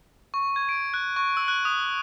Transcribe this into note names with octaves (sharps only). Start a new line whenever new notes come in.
C#6
G#6
D7
F#6
C#6
E6
F#6
D#6